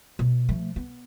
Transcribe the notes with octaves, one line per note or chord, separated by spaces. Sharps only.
B2
F3 A3
B3